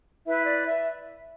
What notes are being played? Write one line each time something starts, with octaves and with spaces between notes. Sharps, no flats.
E4 B4 E5
D5
E5